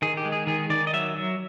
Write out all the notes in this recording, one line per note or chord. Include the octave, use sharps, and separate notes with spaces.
D#3 G#4
G4
G#3
G#4
D#3 G#4
D#3 D5
D#5
F#3 E5
F#3